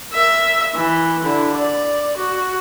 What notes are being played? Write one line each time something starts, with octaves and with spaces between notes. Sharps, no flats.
A#4 E5
E3
D3 E4
D5
F#4